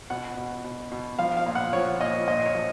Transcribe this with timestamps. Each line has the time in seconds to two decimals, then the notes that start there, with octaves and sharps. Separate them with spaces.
0.10 B2 F#5
0.37 B2
0.64 B2
0.92 B2
1.19 F3 F5
1.37 F5
1.46 A#2
1.55 F#5
1.73 F3 C#5
2.01 A#2 D#5
2.28 A#2 D#5
2.46 C#5
2.55 F3